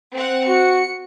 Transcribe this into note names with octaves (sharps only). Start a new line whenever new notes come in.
C4 F#5
F#4 C#7